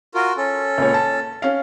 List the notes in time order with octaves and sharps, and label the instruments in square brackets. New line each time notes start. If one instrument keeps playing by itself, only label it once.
[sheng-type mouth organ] F4 F#4 A#4
C#4 A4
[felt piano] C#2 A#2 C#5
A5
C#4 F5